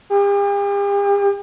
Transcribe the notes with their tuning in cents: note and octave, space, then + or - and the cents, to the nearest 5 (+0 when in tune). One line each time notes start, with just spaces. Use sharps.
G4 +45